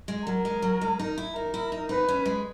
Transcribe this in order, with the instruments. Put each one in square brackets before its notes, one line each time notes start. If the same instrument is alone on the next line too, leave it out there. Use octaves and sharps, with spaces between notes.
[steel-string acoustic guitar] G#3
[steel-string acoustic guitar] F#3 [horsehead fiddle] A#4
[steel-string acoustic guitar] G#3
F#3
G#3
D#4
E4
[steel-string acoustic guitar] D#4 [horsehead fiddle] A#4
[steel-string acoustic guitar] E4
D#4
[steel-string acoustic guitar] D#4 [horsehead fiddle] B4
[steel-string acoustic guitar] C#4
G#3